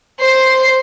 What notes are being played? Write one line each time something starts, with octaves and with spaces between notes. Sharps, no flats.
C5 C7